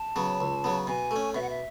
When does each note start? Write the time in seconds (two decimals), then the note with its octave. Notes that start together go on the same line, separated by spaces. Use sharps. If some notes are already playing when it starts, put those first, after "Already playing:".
Already playing: A5
0.16 C#3 F#3 B3
0.40 C#2
0.64 C#3 F#3 B3
0.87 B2 G#5
1.11 A3 C#4
1.35 B2 E5
1.42 F#5
1.50 E5